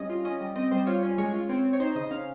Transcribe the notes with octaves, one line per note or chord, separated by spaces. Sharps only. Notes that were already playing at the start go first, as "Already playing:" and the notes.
Already playing: G3 C#4 D#5
F4
C#4 D#5
G3
C4 D#5
G3 C5
F4 C#5
C#4
G#3 C#5
F4
C4 C#5
C4
C#5
D#4 C5
C#3 D#5
C#4 F5